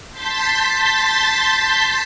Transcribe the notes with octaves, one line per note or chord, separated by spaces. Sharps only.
A5 C6 G6 A6 B6